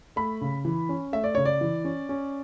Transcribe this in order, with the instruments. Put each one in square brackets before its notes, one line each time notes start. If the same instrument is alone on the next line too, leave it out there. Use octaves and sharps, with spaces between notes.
[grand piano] A3 B5
C#3
E3
C#4
A3 E5
D5
C#3 C#5
D5
E3
C#4
C#4